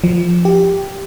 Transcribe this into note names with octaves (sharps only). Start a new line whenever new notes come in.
F3
G4